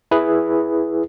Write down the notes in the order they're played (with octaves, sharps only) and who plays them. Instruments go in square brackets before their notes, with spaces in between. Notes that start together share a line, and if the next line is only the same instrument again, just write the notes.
[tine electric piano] E4 G#4 B4